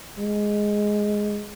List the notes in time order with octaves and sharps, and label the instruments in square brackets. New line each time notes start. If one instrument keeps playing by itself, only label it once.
[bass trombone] G#3